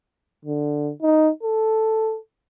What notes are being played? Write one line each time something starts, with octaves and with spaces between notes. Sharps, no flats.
D3
D#4
A4